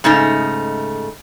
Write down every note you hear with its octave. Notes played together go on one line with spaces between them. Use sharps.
G#2 C#3 A3 D#4